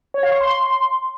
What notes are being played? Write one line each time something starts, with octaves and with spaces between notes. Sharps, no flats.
C#5
F5
C#6
C6